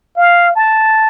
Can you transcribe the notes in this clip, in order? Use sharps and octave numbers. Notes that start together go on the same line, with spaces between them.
F5
A5